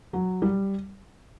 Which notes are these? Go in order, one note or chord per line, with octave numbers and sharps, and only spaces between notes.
F#3
G3